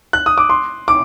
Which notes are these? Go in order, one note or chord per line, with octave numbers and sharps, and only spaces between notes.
F#6
D#6
D6
C6
D6